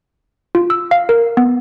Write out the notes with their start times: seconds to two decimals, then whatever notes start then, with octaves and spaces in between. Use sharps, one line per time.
0.55 F4
0.70 E6
0.91 F5
1.09 A#4
1.37 B3